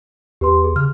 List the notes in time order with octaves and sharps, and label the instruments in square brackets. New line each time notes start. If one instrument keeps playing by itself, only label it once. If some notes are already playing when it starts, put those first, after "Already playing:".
[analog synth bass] E2 [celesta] G4 B4 C6
[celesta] G#4
[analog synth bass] C#3 [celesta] F6